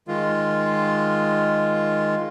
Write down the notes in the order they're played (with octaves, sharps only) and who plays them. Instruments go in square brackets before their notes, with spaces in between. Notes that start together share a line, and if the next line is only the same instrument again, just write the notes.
[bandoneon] D#3 G#3 F4